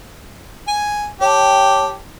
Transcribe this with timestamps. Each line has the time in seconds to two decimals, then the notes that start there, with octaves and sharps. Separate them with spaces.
0.68 G#5
1.21 G4 C#5 G5 A5